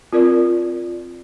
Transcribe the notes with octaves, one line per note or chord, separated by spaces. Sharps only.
C4 F4 A#4 D5